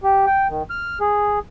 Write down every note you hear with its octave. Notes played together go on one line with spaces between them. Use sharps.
G4
G5
D#3
F6
G#4